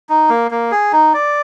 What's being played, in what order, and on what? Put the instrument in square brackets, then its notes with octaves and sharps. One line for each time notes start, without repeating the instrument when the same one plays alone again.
[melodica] D#4
A#3
A#3
G#4
D#4
D5